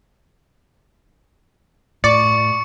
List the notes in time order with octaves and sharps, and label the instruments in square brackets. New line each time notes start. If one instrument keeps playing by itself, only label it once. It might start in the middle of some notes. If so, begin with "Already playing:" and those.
[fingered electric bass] A2 [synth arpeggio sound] D5 D6 [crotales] C#6 C#7